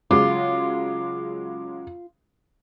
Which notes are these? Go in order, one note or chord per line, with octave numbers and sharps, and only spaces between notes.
C#3 F#3 G#3 F4 D6